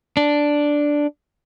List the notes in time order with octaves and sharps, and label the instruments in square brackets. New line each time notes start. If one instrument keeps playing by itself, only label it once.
[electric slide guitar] D4